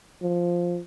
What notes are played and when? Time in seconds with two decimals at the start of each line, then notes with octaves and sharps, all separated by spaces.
0.22 F3